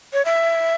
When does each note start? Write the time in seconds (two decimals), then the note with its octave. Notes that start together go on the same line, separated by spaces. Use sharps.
0.13 C#5
0.25 E5